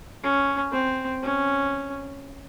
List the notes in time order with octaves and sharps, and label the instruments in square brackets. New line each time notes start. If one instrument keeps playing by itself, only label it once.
[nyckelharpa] C#4
C4
C#4